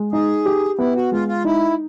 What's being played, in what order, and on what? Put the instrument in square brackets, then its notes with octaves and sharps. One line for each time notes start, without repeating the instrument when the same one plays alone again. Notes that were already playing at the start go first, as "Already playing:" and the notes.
Already playing: [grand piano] G#3
[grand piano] D#4 [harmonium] G#4
[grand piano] G4
[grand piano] B3 [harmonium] E4
[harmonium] F#4
[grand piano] G#3 [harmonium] F4
[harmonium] F4
[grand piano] D#4 [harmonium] E4